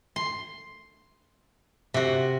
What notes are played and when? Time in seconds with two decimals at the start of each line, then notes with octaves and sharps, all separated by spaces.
0.16 C6
1.94 C3 F#4